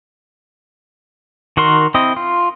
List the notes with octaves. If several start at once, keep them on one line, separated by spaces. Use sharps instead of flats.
D#3 F#4 A#4 C6
C4 E4 D#5
F4